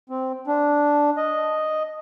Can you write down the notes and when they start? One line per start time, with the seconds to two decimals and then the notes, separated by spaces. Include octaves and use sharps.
0.10 C4
0.47 D4
1.17 D#5